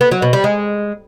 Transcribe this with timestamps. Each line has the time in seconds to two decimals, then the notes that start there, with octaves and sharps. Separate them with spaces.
0.01 B3
0.11 F#3
0.22 B2
0.33 G3
0.44 G#3